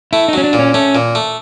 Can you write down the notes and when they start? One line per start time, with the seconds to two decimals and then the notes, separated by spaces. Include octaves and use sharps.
0.13 A3 E4
0.28 D#4
0.33 F#3 C#4
0.44 D4
0.53 A#2
0.59 C#4
0.74 A3 C#4
0.95 A#2
1.15 A3